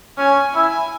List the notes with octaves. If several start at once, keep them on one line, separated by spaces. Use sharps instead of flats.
C#4 G#5
E4 G#5